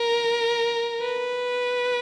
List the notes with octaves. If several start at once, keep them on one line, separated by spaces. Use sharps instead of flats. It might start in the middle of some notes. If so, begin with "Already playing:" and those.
Already playing: A#4
B4